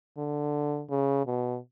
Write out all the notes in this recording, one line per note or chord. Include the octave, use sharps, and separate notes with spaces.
D3
C#3
B2